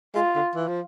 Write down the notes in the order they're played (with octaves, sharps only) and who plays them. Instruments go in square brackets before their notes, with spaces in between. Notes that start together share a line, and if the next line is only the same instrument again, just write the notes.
[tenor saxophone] G#3 [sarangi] F4
[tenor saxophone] D3
E3
F3